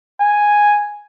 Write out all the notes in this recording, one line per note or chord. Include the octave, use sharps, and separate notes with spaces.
G#5